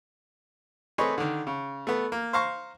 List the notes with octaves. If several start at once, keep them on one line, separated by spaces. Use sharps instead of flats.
A3 C4 G#4 B4 C#5 D#5
D3 D#3
C#3
A3 B3
A#3
C5 F5 A#5 C#6